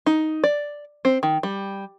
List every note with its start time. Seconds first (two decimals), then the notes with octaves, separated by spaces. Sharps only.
0.06 D#4
0.44 D5
1.05 C4
1.23 D#3
1.43 G3